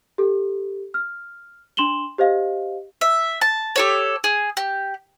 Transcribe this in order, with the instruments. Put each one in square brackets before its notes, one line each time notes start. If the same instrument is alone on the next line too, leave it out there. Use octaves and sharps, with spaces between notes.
[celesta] G4 A4
F6
D4 C6 E7 F#7 G7
G4 C5 D#5 F5
[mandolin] E5
A5
G4 A4 C#5
G#4
G4